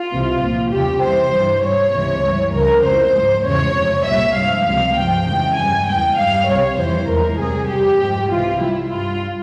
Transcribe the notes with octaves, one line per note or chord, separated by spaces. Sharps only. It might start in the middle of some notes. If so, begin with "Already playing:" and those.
Already playing: F4
C2 C3 E3
C2 A#2 F3
E2 C#3 G3 G4
C2 C3 E3 G3 C5
G2 E3 G3
G#2 G3 C#5
C#2 C3 E3 G#3
G2 E3 G3
C#2 C#3 F3 G#3 A#4
F2 E3 G#3 C5
G#2 F3 G#3
E2 C#3 E3 G#3 C#5
F2 C3 F3
C2 A#2 G3 E5
G2 F3 G#3 F5
C#2 C3 F3 G#3 F5
G2 F3 G#3 G5
F2 C#3 E3 G#3 G5
G2 E3 G3 G#5
E2 E3 G#3 G5
G2 G3 F5
C2 C3 G3 C#5
F2 E3 G3 C5
E2 E3 G#3 A#4
C2 C3 G3 G#4
F2 C3 G3 G4
G#2 F3 G#3
C2 C3 E3 F4
G#2 G3 E4
G2 G3 F4